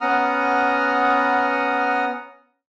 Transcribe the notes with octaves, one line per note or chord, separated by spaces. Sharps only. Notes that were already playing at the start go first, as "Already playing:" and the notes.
B3 C#4 F#5 A#5 D#6 F6